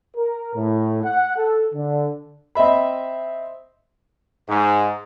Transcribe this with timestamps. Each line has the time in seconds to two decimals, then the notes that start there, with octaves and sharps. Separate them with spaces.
0.17 A#4
0.55 A2
1.03 F#5
1.37 A4
1.74 D3
2.55 C4 D#5 E5 B5
4.47 G#2